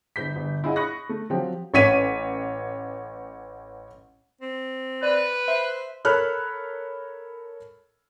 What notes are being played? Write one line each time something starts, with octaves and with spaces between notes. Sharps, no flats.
G1 G6 B6
G1
E4 F4 G#4 D#5 F#5
B5 C#6 D#6 F#6 A#6
A3
F3 F#3 C4 G4
A1 C#5 B6 D#7
C4
B4 D5
C5 E5
A4 A#4 C#5 B5 F6 F#6